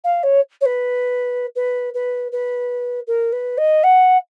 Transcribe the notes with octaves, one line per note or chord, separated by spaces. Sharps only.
F5
C#5
C#5
B4
B4
B4
B4
A#4
B4
D#5
F#5